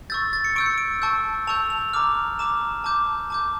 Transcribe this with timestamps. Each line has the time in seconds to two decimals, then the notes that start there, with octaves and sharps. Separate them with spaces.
0.10 C#6 E6 G6 A6
0.33 A6
0.45 C#7
0.56 C#6 E6 G6 D7
0.66 C#7
0.78 D7
1.02 A5 C#6 E6 G6
1.47 A5 C#6 E6 G6 F7
1.70 F7
1.93 A#5 D6 F6
2.39 A#5 D6 F6 E7
2.84 A5 D6 G6
3.30 A5 D6 G6